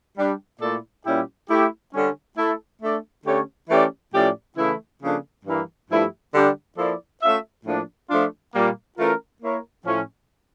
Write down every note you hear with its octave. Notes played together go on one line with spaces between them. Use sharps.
G3 D4 G4
A#2 A3 E4 A4 D5
A#2 G3 C#4 E4 G4
A3 E4 G4
D3 G3 C#4
A3 E4 A4
A3 D4 A4 D5
D3 A3 C#4 G4 C#5
E3 A3 C#4 G4 D5
A2 F3 C#4 G4 D5
C#3 E3 A3 E4
C#3 F3 A#3 D4 A4
G2 E3 A#3
G2 F3 A3 E4 G4
D3 G3 D4 G4
F3 A#3 E4 A4 D5
A3 C#4 F4 A4 E5
A2 F3 A#3 D4
F3 A3 D4 F4
A#2 G3 A#3
E3 A3 C#4 F4 A#4
A#3 E4 A#4 C#5
A2 F3 C#4